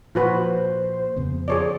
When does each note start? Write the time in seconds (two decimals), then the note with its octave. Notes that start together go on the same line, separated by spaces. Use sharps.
0.15 A#2 F3 F4 F#4 B4 C5
1.16 F2 C#3 B3
1.48 F3 G#4 C#5 D5